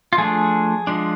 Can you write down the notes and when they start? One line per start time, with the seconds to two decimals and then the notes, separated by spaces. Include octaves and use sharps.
0.13 F4
0.18 F3 A3 D4 G#4
0.87 F3 G#3 D4